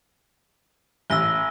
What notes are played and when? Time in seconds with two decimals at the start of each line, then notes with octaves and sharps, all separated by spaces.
1.10 A1 E6 A#6 G7